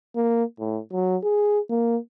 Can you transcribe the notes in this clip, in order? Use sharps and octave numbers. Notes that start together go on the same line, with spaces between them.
A#3
A2
F#3
G#4
A#3